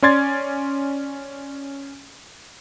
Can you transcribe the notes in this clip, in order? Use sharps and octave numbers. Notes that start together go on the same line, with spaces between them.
C#4 D5 C6 G#6 A6